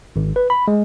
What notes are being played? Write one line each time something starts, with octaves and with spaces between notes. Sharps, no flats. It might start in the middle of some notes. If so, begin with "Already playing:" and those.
G#1
B4
B5
G#3